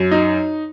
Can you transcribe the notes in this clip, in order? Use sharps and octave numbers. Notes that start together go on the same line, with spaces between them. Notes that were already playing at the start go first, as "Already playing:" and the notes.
Already playing: F#2
D#4